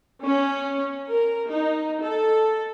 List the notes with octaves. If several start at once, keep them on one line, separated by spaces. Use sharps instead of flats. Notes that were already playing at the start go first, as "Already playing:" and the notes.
C#4
A#4
D#4
A4